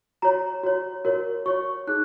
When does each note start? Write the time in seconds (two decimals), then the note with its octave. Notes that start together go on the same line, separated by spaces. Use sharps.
0.22 F#4 C#5 A#5
0.64 F#4 C#5
1.05 F#4 A#4 C#5
1.46 F#4 C#5 C#6
1.87 D#4 G#4 F#6